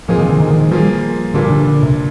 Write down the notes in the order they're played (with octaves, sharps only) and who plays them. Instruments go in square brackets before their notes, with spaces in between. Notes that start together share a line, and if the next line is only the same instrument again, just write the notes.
[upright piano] A#2 G#3 C4 F4 G#4 [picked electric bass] F3
[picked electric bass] D#3
D3
D#3
D#3
D#3
[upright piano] F3 A#3 F4 G#4 [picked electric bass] G3
[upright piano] A#2 G3 D4 F4 [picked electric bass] D3
[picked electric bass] D3
D3
C3